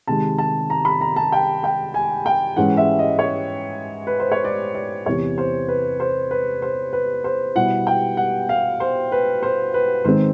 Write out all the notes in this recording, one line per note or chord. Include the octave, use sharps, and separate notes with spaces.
C3 D#3 G#3 A5
A5
A#5
B5
A#5
A5
G5
G5
G#5
G5
G#2 E3 G#3 C#4 F#5
E5
D#5
C#5
B4
C5
C#5
D5
D5
E2 C3 E3 C#5
C5
B4
C5
B4
C5
B4
C5
B2 G3 B3 E4 F#5
G5
F#5
F5
C5
B4
C5
B4
G#2 D#3 G#3 C4 C5